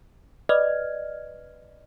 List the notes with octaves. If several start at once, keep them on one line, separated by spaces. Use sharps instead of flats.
B4 D5 D#5 F6 G#6